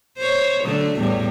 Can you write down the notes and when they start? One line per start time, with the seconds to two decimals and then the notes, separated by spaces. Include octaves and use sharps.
0.18 C5 C#5
0.63 D3 F#3 A3
0.97 E2 A2 G3